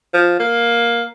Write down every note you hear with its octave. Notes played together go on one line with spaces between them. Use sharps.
F3
A#3